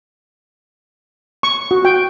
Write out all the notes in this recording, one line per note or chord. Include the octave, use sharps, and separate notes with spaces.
C#6
F#4
G5